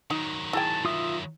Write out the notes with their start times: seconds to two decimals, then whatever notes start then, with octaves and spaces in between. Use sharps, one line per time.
0.11 D#3 F#3 D#4
0.53 E4 G#4 G5 A5
0.85 F4 E5 D#6